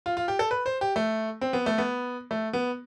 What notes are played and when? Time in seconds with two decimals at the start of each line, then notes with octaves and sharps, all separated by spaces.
0.06 F4
0.17 F4
0.28 G4
0.39 A4
0.51 B4
0.66 C5
0.81 G4
0.96 A3
1.41 C4
1.53 B3
1.66 A3
1.78 B3
2.31 A3
2.53 B3